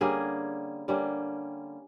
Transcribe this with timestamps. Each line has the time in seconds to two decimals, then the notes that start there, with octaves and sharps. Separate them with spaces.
0.01 D3 G3 A#3 C#4 G#4
0.88 D3 G3 A#3 C#4